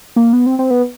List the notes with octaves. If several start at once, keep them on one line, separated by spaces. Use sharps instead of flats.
A#3
B3
C4
C4
B3